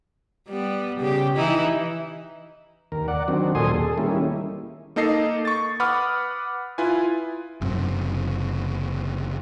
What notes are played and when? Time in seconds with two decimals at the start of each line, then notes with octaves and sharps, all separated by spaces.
0.49 G3 B3
1.00 C#3 G4
1.36 E3 D#4 E4
2.92 D#2 A#4
3.08 D5 F#5
3.28 D#3 F#3 C4 D4
3.55 D#2 A#2 A4 G#5 C6 D#6
3.75 G#4 A4
3.98 D#3 G3 A#3 C#4 E4
4.96 A#3 D#4 A4 D#5 C7
5.45 C#6 A6
5.80 B4 F#5 B5 D6 D#6 F6
6.78 E4 F4 B4 G#5
7.61 F#1 F#2 C3